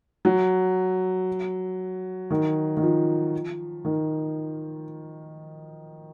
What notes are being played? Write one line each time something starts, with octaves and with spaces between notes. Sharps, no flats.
F#3
D#3
D#3
F3
D#3